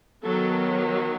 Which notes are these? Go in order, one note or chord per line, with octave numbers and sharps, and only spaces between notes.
D#3 F#3 B3 A4